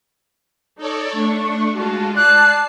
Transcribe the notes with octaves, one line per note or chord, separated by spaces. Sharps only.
D#4 A4 C#5 D5
A3 D4 C#6
G#3 F4 F#4 A5
D5 A5 F#6 C7